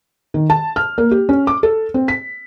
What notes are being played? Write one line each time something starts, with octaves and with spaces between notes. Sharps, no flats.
D#3
A5
F6
A#3
G4
C#4
D6
A4
C4
B6